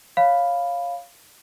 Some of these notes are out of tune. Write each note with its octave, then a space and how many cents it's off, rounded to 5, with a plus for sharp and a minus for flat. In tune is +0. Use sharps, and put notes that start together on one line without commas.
C#5 +0 F5 +0 B5 +0